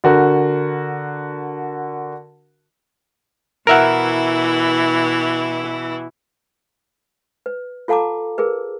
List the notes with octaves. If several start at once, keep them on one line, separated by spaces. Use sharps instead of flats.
D3 F#4 A#4
B2 E3 E4 A#4 E5 F#5
B4
F4 A4 F5 A5 A#5 D6
G#4 A#4 B4